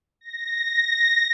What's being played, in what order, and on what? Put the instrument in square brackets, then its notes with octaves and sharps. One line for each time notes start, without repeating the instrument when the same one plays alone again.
[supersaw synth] A#6